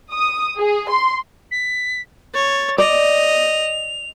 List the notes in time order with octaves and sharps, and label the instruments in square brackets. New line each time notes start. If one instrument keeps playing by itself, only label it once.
[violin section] D#6
G#4
C6
[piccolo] B6
[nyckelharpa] C#5 [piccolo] A6
[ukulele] D5 [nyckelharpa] D#5 [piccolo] F7